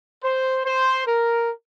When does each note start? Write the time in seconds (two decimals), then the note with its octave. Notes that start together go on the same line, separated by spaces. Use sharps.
0.22 C5
0.64 C5
1.07 A#4